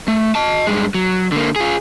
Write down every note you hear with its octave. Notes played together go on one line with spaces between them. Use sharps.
A3
D#5 A5
G2 G#3
F#3
D3 A#3
F4 G#4